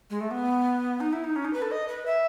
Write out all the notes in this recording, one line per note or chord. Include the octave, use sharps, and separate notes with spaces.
G#3
A3
B3
D#4
E4
D#4
C#4
D#4
B4
A4
D#5
B4
E5